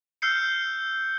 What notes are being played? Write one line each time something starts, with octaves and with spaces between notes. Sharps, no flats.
E6 F6 G6 C7 C#7